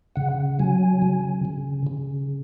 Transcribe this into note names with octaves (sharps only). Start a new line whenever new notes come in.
C#3 F#5
F#3 G#5
C#3
C#3
C#3